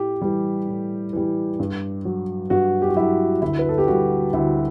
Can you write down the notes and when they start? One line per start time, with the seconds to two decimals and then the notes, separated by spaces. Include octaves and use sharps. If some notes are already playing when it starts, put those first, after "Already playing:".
Already playing: A2 G4
0.21 E3 G3
0.67 A2
1.13 E3 G3
1.59 G2
2.05 F#3
2.50 G2 F#4
2.82 G4
2.89 F#4
2.96 F#3 E4
3.42 D2 E4
3.59 B4
3.69 A4
3.78 G4
3.87 D3 G3 F#4
4.33 D2 E4